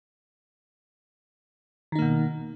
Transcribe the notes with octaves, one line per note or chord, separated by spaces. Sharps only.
B2 D#3 A#3 D#4